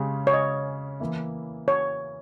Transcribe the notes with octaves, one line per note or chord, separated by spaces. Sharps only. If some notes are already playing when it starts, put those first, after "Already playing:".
Already playing: C#3 G#3 C#4 G4
C#5
D#5
E3 A#3 E4
C#5